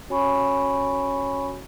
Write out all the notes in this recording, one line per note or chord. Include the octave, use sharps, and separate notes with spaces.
C#4 F#4 C#5 G#5 B5 C#6